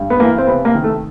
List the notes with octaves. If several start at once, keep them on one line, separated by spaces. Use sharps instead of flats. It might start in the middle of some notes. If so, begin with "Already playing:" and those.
Already playing: G2
B3
E3 A#3
C4
C3 B3
A#3
D#3
A3